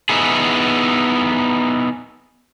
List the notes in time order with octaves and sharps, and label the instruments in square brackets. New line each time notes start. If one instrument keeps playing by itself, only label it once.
[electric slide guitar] B3 D#4 E4 G#4